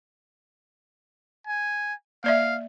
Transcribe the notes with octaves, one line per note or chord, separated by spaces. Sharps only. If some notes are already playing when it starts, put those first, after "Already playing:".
G#5
A#3 D5 E5 F5